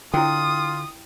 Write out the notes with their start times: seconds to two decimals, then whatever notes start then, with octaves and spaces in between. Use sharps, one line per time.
0.14 D3 E4 F4 G5 D#6